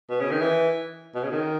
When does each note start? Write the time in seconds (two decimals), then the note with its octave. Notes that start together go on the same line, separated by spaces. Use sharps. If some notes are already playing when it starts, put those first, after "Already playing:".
0.10 B2
0.21 C#3
0.31 D#3
0.41 E3
1.15 B2
1.23 C#3
1.31 D#3